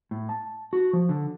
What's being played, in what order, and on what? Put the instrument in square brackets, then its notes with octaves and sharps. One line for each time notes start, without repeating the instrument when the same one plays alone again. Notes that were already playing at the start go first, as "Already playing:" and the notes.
[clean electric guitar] A2
A5
F#4
F3
D3